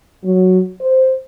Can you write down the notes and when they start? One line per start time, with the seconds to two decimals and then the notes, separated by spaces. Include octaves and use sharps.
0.24 F#3
0.81 C5